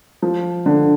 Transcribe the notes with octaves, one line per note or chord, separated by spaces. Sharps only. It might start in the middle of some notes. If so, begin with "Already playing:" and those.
F3
D3